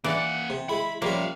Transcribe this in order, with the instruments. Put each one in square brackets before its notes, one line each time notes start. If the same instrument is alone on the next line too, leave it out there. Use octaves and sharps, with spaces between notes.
[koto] E3 D5 [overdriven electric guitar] A#3 F#5
[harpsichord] C3
[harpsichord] G#3 E4 [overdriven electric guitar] B5
[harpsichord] F3 G3 C#4 [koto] A#3 [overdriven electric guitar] E5 F5